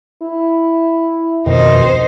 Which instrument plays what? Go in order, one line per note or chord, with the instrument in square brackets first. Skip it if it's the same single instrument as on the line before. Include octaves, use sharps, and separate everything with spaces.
[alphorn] E4
[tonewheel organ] F2 B2 D#3 [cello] D#4 C5